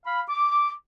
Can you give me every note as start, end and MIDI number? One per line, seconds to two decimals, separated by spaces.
0.06 0.21 77
0.06 0.21 83
0.29 0.72 86